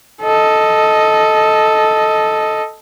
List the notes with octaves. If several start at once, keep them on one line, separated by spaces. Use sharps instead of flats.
A4 D#5